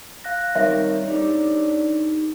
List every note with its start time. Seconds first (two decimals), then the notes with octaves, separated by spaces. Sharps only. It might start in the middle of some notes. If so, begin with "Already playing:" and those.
0.24 F5 F#6 A#6
0.55 D#3 G3 C4 C#5 E5
1.08 D4 D#4 G4 A4